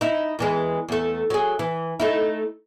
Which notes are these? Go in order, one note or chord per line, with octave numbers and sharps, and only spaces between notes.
D#4 E4
E2 E3 G#3
E2 A3
F#3 G#4
E3
A3 D#4 E4